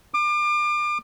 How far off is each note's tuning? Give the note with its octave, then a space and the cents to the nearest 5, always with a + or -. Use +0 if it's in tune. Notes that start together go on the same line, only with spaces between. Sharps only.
D6 +35